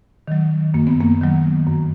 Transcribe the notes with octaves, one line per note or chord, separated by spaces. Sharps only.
D#3 F#3
F#2 A#3
B3
A#3
D#3 F#3
F#2